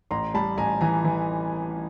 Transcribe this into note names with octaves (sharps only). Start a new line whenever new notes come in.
A1 A#5 C6
G3 A5 B5
A1 G#5 A#5
E3 G#5 A#5
E3